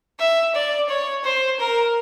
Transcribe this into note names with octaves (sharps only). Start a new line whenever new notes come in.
E5
D5
C#5
C5
A#4